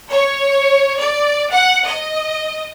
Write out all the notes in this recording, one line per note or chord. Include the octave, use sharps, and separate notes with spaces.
C#5
D5
F#5
D#5